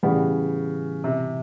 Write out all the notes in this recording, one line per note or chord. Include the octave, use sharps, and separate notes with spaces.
A2 C#3 E3 G3 B3
C3